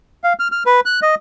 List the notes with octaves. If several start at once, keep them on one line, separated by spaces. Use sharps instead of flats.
F5
F6
F6
B4
F#6
D#5